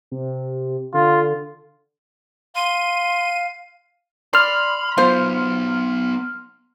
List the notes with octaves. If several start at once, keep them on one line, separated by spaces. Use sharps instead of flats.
C3
D3 F4
F5 C6 D#7
D5 B5 C6 F6
F#3 B3 F4 C5